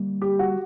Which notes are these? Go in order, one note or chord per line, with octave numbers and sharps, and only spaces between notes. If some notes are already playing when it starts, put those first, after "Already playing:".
Already playing: D3 G3 A#3
G4
F#4